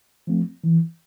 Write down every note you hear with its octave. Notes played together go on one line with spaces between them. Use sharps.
F3 A3 C4
E3